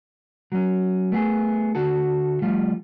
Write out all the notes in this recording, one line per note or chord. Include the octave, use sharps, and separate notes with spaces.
F#3 C#4
A3 B3 G#4
D3 F#4 A4
F3 G3 A3 F4